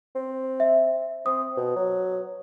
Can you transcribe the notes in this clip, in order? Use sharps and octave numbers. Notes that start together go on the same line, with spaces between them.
C4
E5
C4 D#6
B2
F#3